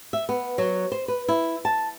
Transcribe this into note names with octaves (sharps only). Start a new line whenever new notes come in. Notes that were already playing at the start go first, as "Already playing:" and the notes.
E5
B3
F#3
C5
B4
E4
A5